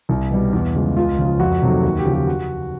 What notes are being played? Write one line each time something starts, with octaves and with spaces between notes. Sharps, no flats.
C2
B2 G3
E2
C#3 F3 G#3
C#2 F4
C#3 F3
F2 F#4
C3 D#3 F#3 A3
D#2 F#4
G4
C#3 F3
G4
F#4